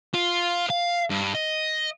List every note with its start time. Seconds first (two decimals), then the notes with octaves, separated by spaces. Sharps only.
0.14 F4
0.70 F5
1.10 G2
1.35 D#5